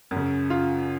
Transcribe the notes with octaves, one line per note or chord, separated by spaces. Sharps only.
F#2
C#3
F4